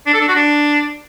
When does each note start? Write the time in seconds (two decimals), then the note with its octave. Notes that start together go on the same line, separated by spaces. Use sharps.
0.07 D4
0.14 A4
0.21 D4
0.28 F#4
0.35 D4